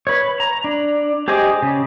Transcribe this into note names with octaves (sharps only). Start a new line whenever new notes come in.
B4 C#5
A#5
D4
G4 G#4 C5 D#5 D6
C#3